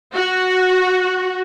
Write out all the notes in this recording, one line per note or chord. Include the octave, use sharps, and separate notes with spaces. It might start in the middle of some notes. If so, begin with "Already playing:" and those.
F#4